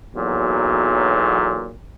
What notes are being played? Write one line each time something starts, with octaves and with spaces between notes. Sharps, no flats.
B1 E2 A#2 F#3